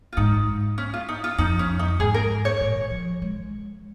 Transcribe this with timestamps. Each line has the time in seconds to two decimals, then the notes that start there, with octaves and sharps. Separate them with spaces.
0.13 F4
0.17 G#2 D#4
0.78 C#4
0.94 F4
1.09 D#4
1.24 F4
1.38 F2 D#4
1.59 C#4
1.79 D#4
1.88 F2
1.99 G#2 G#4
2.14 A#4
2.45 C#5
2.61 A#2
2.91 F3
3.22 G#3